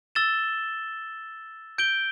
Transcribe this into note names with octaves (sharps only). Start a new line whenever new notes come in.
E6 A6 E7 G7
G6 D7 G7